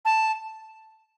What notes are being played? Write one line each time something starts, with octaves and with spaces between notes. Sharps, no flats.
A5